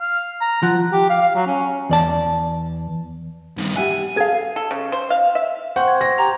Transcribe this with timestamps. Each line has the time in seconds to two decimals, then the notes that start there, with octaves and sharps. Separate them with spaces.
0.01 F5
0.41 A#5
0.63 F3 F#5
0.92 G4
1.09 F5
1.21 F5
1.35 F#3
1.47 C#4
1.90 E2 D5 A5
3.57 G2 D#3
3.76 G3 E5 F#5 G#5
4.16 G#4 A4 F5 G#6
4.56 A4
4.71 C#3
4.92 C5
5.10 F5
5.35 E5
5.76 C4 F#5 C6 C#6 G6
5.88 G#6
6.01 A#6
6.18 G4 A#5 F7